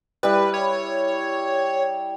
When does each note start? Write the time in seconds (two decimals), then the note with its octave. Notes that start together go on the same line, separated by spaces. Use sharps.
0.23 G3 E4 B4
0.54 C#5